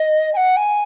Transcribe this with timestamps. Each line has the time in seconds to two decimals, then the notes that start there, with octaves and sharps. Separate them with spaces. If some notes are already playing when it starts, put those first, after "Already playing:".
Already playing: D#5
0.33 G#5
0.36 F#5
0.56 G#5